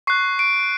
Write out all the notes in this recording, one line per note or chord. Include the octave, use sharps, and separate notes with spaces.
C#6 F#6 C7
D7